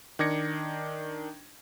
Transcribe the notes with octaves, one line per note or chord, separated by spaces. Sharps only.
D#3 D4 D6 G#6 A#6 C#7